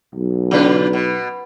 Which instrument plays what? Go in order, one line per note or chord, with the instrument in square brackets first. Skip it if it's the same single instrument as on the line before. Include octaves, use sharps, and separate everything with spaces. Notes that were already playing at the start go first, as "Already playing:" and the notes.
[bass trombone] B1
[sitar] C#3 F4 B4
B2